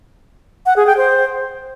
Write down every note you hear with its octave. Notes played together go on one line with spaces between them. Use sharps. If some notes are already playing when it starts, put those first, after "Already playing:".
F#5
G#4
G5
C5